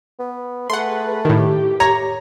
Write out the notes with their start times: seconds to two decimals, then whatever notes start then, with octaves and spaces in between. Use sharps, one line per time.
0.19 B3
0.70 A3 G#4 B4 F#5 C6
1.25 A2 D#3 G4
1.80 C#5 A#5